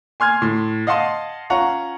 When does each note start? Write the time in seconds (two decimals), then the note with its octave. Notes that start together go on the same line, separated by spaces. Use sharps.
0.20 G#5 C6 F6 G#6
0.42 A2 C6
0.87 D#5 F5 F#5 A5 C6 D#6
1.50 C#4 F4 F#5 A#5 C#6